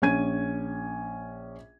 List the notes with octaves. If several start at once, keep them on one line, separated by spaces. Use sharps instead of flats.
A#1 C#4 G#5 G#6 D#7